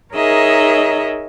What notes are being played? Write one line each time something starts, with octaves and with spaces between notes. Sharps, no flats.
D#4 G#4 A#4 C#5 D#5 E5